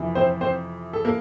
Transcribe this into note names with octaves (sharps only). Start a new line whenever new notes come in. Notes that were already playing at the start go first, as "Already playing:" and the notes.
Already playing: F2 C3 E3
C4 C5
C4 C5
A4
A#3 A#4